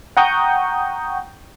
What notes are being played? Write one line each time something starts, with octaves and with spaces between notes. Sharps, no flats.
F#5 G5 A#5 C#6 D#6 G6